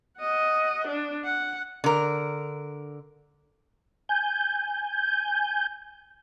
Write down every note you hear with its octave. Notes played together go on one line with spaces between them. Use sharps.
D#5 F#5
D4
F#5
D3 A#4
G#5 G6